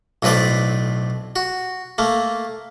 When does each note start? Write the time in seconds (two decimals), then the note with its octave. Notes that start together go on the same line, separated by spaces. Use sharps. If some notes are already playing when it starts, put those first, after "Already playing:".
0.23 B1 A2 C4 B4 C5 D5
1.36 F#4
1.98 A3 A#3